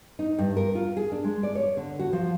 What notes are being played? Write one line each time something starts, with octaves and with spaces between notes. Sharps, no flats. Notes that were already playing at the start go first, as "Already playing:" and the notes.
D#4
G2
A#4
F4
G#4
D4
G#3
D5
C#5
D3
F#4
F3